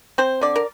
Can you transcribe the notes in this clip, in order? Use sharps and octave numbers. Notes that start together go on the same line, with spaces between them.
C4 C5
D3 D5
A#4